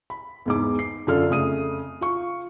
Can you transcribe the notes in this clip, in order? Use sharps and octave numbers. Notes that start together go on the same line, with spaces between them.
B5
E2 G#2 D6
C7
F#2 D3 F4 A4 D5 F6
F2 C#3 A3 D#6 D#7
F4 C#6